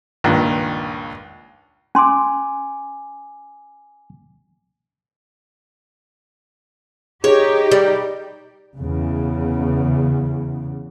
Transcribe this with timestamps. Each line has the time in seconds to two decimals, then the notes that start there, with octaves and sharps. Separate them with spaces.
0.24 C#2 G2 A#2 D#3
1.95 C#4 G#5 C6 D6
7.24 D#4 G4 G#4 C#5
7.72 G3
8.79 E2 C#3